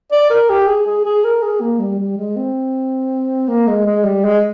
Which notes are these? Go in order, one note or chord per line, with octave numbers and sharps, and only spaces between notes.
D5
A#4
G4
G#4
G#4
G#4
A#4
G#4
A#3
G3
G3
G#3
C4
A#3
G#3
G#3
G3
G#3